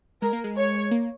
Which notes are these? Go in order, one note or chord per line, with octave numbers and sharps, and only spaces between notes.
G#3 A#4
A#3
G#3
C#5
A#3